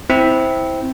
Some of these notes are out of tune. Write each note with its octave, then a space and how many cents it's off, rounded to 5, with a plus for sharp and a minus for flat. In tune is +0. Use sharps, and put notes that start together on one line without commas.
C4 +0 E4 -15